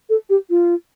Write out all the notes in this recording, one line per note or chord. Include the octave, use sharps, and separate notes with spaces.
A4
G4
F4